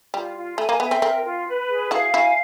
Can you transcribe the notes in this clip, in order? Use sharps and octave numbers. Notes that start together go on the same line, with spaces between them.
G3 F4
F4
A3 G#5
A#3
B3 E5
C4
C4 A#4
F4
B4
G#4
E4 F#4 F5
E4 F#4 G#5